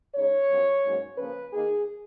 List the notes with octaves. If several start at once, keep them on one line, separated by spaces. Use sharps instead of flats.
C#3 G#3 D#4 C#5
F#2 F3 B3
G#2 F#3 A#3 C#4
C#3 F3 A#3 C#4 B4
D#3 A#3 D#4 G#4